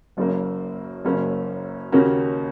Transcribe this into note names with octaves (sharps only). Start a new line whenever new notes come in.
F#1 F#2 C#3 A#3
F#1 F#2 C#3 A#3 C#4
D#2 C#3 A#3 C#4 F#4